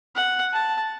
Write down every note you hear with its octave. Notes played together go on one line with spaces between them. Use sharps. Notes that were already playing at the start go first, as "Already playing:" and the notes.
F#5
A5